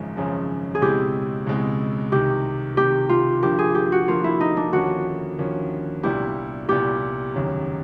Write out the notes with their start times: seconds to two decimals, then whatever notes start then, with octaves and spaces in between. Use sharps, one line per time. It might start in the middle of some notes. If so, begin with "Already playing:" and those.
Already playing: G#1 F#2 C#3 F3 G#3
0.16 G#1 F#2 C#3 F3 G#3
0.75 G#4
0.81 C#2 B2 G#3 C4 E4 G4
1.46 C#2 B2 G#3 C4 E4
2.12 C2 C3 D#3 G4
2.77 C2 C3 D#3 G4
3.09 F4
3.43 G2 D3 F3 A#3 G4
3.59 G#4
3.75 G4
3.92 F#4
4.08 G2 D3 F3 A#3 F4
4.24 E4
4.41 D#4
4.57 D4
4.73 D#2 D3 F3 A#3 C#4 F#4
5.38 D#2 D3 F3 A#3 C#4
6.03 C2 A#2 G3 B3 E4 G4
6.69 C2 A#2 G3 B3 E4 G4
7.35 F1 D#2 C#3 F#3